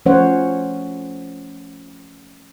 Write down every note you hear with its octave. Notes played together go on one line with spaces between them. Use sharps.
F3 A3 C#4 C5 C#5 F#5